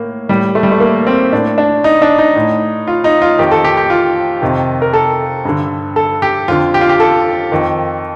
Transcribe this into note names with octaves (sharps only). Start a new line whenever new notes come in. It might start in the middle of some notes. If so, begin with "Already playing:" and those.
Already playing: A2 A#3
A2 G3
A3
G3
A3
A#3
C4
A2 D4
D4
D#4
D4
D#4
A2
F4
D#4
F4
F2 D#3 G4
A4
G4
G4
F4
F2 C3 D#3
A#4
A4
G2 D3
A4
G4
F2 D3 F4
G4
F4
G4
A4
F2 D#3